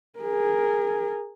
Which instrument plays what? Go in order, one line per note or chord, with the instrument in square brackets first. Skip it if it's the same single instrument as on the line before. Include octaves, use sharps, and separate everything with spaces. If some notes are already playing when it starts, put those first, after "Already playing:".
[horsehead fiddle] G#4 A#4